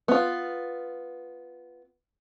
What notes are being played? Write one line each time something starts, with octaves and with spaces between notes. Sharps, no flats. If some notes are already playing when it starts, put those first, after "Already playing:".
B3 F4